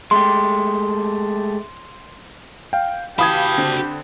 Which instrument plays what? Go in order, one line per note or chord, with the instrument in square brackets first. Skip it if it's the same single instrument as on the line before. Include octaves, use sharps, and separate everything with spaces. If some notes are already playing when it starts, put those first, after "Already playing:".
[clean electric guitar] G#3 A3 G4 [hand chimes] C6
[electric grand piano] F5 G5
[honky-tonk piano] E3 F5 [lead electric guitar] F#4 A5 [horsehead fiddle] G4 [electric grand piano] B5 D#6 G#6
[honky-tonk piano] D3 C4